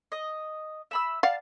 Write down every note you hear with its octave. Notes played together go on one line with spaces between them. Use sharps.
D#5
E5 B5 E6
D5 F5 F#5 A5